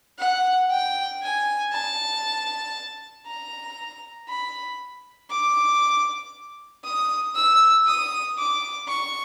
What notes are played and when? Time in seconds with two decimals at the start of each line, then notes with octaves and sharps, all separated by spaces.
0.19 F#5
0.70 G5
1.22 G#5
1.72 A5
3.27 A#5
4.28 B5
5.30 D6
6.84 D#6
7.35 E6
7.87 D#6
8.38 D6
8.89 C#6